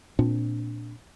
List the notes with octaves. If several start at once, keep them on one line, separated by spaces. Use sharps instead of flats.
A#2 C4 D4